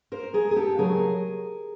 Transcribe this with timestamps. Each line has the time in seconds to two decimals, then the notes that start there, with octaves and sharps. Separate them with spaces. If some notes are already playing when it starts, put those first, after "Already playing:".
0.12 A#4 C5
0.34 G#4 A#4
0.51 G#4
0.56 G4 A4
0.78 C#3 F#3 A3 G#4 A#4